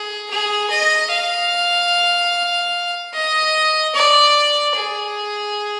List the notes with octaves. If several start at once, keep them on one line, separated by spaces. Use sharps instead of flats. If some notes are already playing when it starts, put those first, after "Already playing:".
Already playing: G#4
G#4
D#5
F5
D#5
D5
G#4